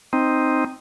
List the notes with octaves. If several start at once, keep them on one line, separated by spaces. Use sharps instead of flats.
C4 D#4